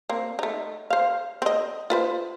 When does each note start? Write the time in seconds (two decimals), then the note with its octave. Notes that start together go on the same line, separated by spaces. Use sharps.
0.10 A#3 C4
0.39 A3 D#4
0.90 C5 F5
1.42 C4 D#5
1.90 F4 B4 C5